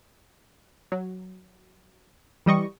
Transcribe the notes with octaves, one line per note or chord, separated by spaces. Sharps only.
F#3
E3 G3 D#5 C#6